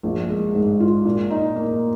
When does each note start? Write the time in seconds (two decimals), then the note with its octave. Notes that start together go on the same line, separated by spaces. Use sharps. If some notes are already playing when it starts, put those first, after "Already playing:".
0.03 A#1
0.29 G#3
0.55 G#2
0.80 F4
1.05 A#2
1.30 D#4
1.56 A#3